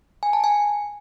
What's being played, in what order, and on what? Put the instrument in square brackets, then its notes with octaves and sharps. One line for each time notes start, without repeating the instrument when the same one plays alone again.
[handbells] G#5
A5
G#5